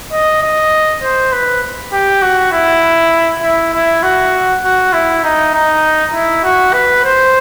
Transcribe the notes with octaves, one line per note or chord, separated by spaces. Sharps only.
D#5
D#5
C5
B4
G4
F#4
E4
E4
E4
F#4
F#4
E4
D#4
D#4
E4
F#4
B4
C5